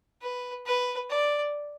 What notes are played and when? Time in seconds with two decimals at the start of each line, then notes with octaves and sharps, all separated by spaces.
0.22 B4
0.66 B4
1.10 D5